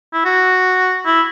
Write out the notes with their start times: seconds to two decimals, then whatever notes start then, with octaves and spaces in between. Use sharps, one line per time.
0.13 E4
0.25 F#4
1.05 E4